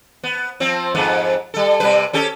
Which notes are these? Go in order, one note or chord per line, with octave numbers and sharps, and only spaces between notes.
B3
F3 C4
F2 G#2 B3
G3 A4
C3 G3 B4
C#4 G4 A4